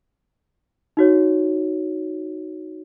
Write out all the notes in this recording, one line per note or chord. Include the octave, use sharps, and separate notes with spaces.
D#4 F#4 C#5